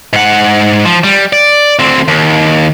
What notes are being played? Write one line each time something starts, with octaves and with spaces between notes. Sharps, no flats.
G#2 F#5
F3
G3
D5
D2 C4
D#2